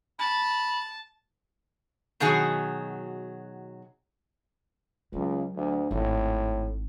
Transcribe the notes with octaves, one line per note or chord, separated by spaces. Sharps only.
A5 B5
B2 D#3 F#3 F#4 G#4
C#2 F#3
D2
G#1 A2